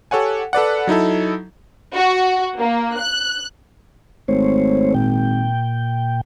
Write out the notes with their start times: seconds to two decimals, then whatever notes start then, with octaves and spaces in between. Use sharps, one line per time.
0.11 G4 A4 C#5 F#5 G#5
0.53 A4 B4 D5 F#5
0.87 F#3 D#4 E4 A4
1.94 F#4
2.59 A#3
2.99 F#6
4.28 G#1 A3 C5 C#5
4.94 A#2 G5